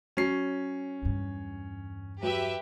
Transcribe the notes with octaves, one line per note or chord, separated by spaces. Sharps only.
F#3 C#4 C7
E2 G2
F#3 G4 B4 E5